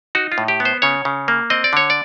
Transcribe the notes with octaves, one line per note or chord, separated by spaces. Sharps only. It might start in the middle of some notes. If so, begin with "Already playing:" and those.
D#4 F#4
F4
A2
G4
B3
C5
C#3 C#5
C#3
A#3
C4 D#5
D5
D3 C#5
D5